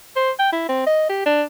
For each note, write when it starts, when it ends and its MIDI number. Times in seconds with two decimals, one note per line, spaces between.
0.16 0.31 72
0.39 0.51 79
0.52 0.66 64
0.69 0.86 60
0.87 1.08 75
1.09 1.21 67
1.26 1.42 62